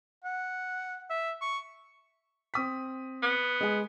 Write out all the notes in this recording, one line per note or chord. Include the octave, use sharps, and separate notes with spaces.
F#5
E5
C#6
C4 D#6 B6
B3
G#3 G#4